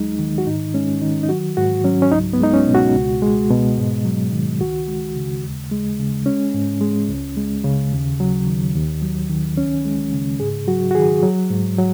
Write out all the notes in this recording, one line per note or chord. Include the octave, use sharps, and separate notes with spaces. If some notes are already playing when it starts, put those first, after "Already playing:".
Already playing: D#2 F#3 G#3 D#4
D#3
F#4
G#2 D#4
G#3 C#4
D#3 D#4
D#4
F#3 F#4
G#2 F#4
F#3 C#4
C#4
C#2 D#4
B3
G#3 D#4
C#4
B2
F#4
C#2
G#3
B2
G#2
F#3
D#3
C#2 F#4
G#3
C#3
D#2
G#3
C#3
G#3 C#4
G#2
G#3
C#2
G#3
C#3
D#2
F#3
D#3
D#2
F#3
D#3
C#2 C#4
G#3
C#3
G#2 G#4
F#3 F#4
F#4
D#3 G#4
F#3
G#2
F#3